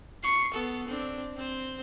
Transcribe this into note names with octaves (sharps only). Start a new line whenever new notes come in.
C#6 C7
B3 A4
C4 D4
C4 C5